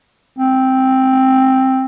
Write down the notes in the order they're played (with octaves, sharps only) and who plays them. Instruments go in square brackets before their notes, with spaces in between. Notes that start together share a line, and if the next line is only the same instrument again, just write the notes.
[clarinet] C4